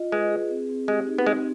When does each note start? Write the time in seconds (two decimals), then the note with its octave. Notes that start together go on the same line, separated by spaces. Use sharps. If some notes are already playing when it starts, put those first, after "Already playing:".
Already playing: F4 D#5
0.11 G#3 B4
0.31 G#4
0.50 C4
0.69 C4
0.88 G#3 G4
1.07 D#4
1.18 B3
1.26 G#3 C4